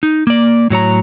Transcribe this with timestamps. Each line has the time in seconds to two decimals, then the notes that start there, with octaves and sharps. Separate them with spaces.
0.03 D#4
0.27 A#3 D5
0.70 A2 F#3 C#5 A#5